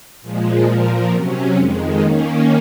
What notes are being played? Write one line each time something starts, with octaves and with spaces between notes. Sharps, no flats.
A#2 F3 G#3
A#2 F3 A#3
C3 F#3 C#4
F2 D#3 G#3
D#3 A#3 C#4